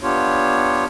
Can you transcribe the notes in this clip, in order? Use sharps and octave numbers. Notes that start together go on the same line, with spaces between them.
B3 D4 F4 G4 C#5